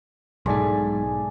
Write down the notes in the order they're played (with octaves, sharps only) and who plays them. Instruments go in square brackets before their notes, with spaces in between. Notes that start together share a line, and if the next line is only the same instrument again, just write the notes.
[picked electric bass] B1 G#2 [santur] A3 D4 G#4